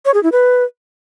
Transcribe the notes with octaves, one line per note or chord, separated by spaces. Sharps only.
C#5
G#4
E4
B4